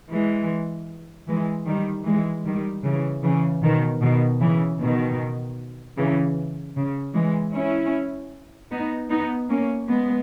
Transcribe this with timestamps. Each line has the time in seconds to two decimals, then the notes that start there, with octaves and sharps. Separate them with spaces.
0.11 E3 G#3
1.28 E3 G#3
1.67 D#3 G3
2.06 E3 G#3
2.46 D#3 G3
2.84 C#3 E3
3.23 C#3 E3
3.63 B2 D#3
4.02 B2 D#3
4.40 C#3 E3
4.80 B2 D#3
5.97 C#3 E3
6.76 C#3
7.14 E3 G#3
7.54 C#4 E4
8.71 B3 D#4
9.11 B3 D#4
9.49 A#3 C#4
9.88 G#3 B3